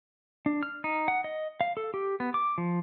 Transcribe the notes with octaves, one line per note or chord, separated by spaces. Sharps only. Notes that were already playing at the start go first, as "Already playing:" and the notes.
D4
F6
D#4
F#5
D#5
F5
A4
G4
B3
D6
F3